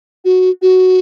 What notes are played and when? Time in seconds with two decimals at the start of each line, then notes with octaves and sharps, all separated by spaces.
0.25 F#4
0.62 F#4